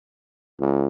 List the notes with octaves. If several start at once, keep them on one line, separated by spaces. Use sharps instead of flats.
C#2